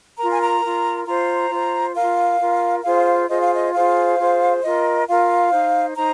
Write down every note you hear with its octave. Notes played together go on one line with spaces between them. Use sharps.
F4 A#4 A#5
G#5
A#5
F4 A#4
F4 C5 A#5
F4 C5
F4 A#4 F5
F4 A#4
F4 G#4 C5 F5
F4 G#4 C5 D#5
F5
D#5
F4 G#4 C5 F5
F4 G#4 C5
F4 A#4 D#5
F4 A#4 F5
D#4 C5
D#4 C5 A#5